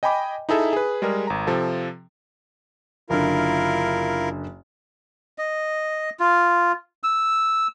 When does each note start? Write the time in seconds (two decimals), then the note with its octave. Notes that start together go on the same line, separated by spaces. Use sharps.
0.03 D#5 G5 G#5 B5 D6
0.49 D#4 E4 G#4 A4 E5
0.73 G#4 B4
1.02 G3 G#3 G#4 A#4
1.27 G#1 A#5
1.47 C3 F3 A4
3.10 F#1 D3 E4 F4 A#4
5.38 D#5
6.20 F4
7.03 E6